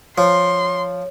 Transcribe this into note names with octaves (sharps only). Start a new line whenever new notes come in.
F3 C#5 C6